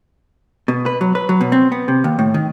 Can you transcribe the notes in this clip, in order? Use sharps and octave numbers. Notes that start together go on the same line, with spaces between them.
B2
B4
F#3
B4
F#3
B2
C4
B3
C3
D#2
A2
D#3